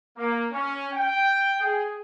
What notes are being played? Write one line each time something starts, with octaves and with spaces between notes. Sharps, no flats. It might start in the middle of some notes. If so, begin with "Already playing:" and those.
A#3
C#4
G5
G#4